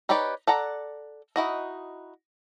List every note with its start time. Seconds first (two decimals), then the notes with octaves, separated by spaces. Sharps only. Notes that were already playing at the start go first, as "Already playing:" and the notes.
0.09 D#4 G4 B4 C#5 D5
0.47 A4 D5 F#5 A#5
1.36 D#4 E4 F#4 D#5